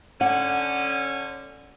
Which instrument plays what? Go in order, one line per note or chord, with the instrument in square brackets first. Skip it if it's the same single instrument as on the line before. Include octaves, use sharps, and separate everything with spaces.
[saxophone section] D3 C#4 [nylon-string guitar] F#5